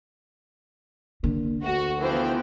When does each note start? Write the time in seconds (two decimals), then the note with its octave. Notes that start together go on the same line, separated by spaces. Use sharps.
1.24 D3 A#3
1.62 D2 F#4
2.01 E3 F3 B3 C5 G5